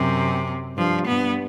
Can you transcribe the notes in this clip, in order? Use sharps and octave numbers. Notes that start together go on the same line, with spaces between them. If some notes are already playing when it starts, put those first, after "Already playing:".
Already playing: F#2 C3
G2 F3
G2 B3